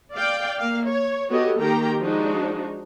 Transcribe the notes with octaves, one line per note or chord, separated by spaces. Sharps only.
D5 F5 G5
A#3 F5
C#5
B3 F#4 G4 A4 C#5 D#5
D#3 A#3 G4 G5 A#5
F3 G#3 D4 D#4 F#4